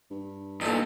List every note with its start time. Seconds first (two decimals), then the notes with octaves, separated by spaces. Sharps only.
0.10 G2
0.61 E2 A#2 D#4 A4